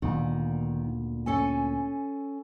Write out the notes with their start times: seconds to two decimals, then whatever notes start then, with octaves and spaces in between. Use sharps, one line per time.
0.02 D2 A#2 D#3 B3
1.26 C#4 A4 G#5